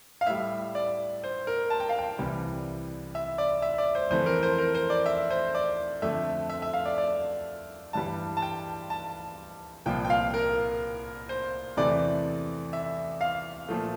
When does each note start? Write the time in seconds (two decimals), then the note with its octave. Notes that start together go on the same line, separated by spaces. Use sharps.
0.21 F5
0.27 A2 G3 E5
0.75 D5
1.24 C5
1.47 A#4
1.70 A5
1.80 G5
1.89 F5
1.98 G5
2.19 C2 C3 E3 G3
3.15 E5
3.38 D5
3.62 E5
3.78 D5
3.95 C5
4.10 F2 E3 A3 C5
4.26 A#4
4.43 C5
4.58 A#4
4.75 C5
4.90 D5
5.06 E5
5.30 C5
5.55 D5
6.02 F2 D3 A3 E5
6.49 E5
6.62 E5
6.74 F5
6.85 D5
6.98 D5
7.93 G2 E3 G3 A5
8.37 A5
8.42 G5
8.90 A5
9.86 C2 A#2 F3 G5
10.05 G5
10.10 F5
10.34 A#4
11.29 C5
11.77 E2 C3 E3 A3 D5
12.73 E5
13.21 F5
13.69 A#2 F3 A3